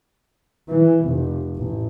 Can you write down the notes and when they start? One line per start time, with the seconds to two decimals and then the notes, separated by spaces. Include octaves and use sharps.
0.69 E3
1.05 F1
1.56 A1